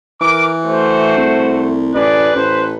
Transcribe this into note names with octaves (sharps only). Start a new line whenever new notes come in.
E3 A#4 D6
A3 F#4 C5
C2
A1 G#4 B4 D5
A1 C5